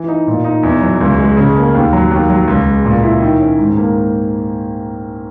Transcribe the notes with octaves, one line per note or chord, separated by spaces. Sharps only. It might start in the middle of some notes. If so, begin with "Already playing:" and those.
Already playing: E3
D#4
A#2
D#4
E2
F#3
C#2
G#3
C#3
A#3
D#2
F#3
D#2
F#3
C#2
G#3
A#2
E4
D#3
C#4
G#2
A#3